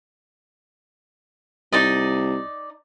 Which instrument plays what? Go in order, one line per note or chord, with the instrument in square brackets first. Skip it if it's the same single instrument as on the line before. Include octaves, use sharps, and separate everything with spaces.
[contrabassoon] C2 [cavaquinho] D#4 D5 D#5